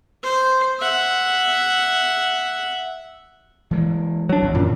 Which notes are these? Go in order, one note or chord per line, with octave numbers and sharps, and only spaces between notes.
C5
E5 F#5
E3 G#3 A#3
F#3 D4
G#1 E2
F#2 A#2